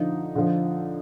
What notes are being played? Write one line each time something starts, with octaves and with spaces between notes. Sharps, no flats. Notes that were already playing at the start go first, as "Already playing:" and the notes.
Already playing: D3 F3 D#4
D3 F3